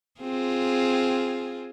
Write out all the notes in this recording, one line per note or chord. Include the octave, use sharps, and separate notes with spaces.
C4 F4 G#4